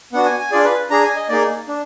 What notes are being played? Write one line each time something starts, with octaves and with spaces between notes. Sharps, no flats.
B3 D4 F#4 F#5
G#5
G#5
D4 F4 G#4 D5
B4
D4 G#4 A#5
G#5
D#5
A#3 D#4 G#4 D5
D4